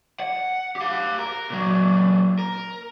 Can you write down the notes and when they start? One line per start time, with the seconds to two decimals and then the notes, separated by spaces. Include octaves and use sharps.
0.20 F#5
0.76 G4 F5
1.19 A#4
1.50 A#2 F#3
2.39 A#4